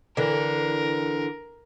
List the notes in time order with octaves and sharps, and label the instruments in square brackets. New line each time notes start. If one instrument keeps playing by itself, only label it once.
[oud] D3 E3 [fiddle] A#4